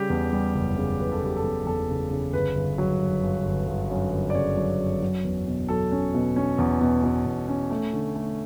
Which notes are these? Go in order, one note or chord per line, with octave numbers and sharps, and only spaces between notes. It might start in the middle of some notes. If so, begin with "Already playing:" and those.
Already playing: C#3 G3 G4
E2
G3
F#1
C#3
F#1 B4
A4
F#1 G4
A4
E2
E2 A4
C#3
C#3
G1 B4
G1
F#3
F#2
G1
G1
G1
F#2
G1
D5
C#3 C#5
F#3
F#2
F#3
E2
B2
F#3 A4
C#4
B2
C#4
E2
B2
B2
E2
C#4
A3
D3
A3